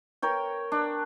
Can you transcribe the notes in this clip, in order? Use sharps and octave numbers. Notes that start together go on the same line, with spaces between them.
A#4 C#5 G5
D4